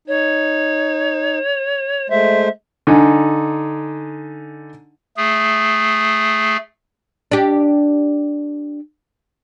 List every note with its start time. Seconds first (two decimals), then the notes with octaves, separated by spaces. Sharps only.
0.08 D#4 C#5
2.10 G#3 A3 C5 E5
2.87 D3 D#4 G#5
5.17 A3 G#4
7.32 D4 G4